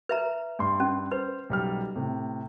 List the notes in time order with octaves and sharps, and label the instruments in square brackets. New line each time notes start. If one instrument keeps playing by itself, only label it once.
[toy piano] B4 E5 A#5
[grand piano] G2 C6
[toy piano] C#4
[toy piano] B4 [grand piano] C5
[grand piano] B1 G3 F6
A2 C3